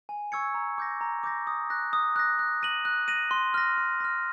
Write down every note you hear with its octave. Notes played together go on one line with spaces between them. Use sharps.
G#5
C#6 E6 G#6 C#7
A#5
D6 G6 A#6
A#5
D6 G6 A#6
D#6
F#6 A#6
D#6
F#6 A#6
F#6
A#6 D#7 F#7
F#6
A#6 D#7 F#7
C6
F6 A#6
C6
F6 A#6